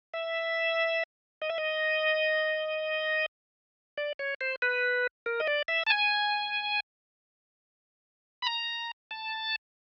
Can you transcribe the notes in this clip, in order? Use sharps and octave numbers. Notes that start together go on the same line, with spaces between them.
E5
D#5
E5
D#5
D5
C#5
C5
B4
A#4
D#5
D5
E5
A5
G#5
B5
A#5
A5